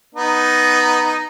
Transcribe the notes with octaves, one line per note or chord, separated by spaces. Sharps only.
B3 D#4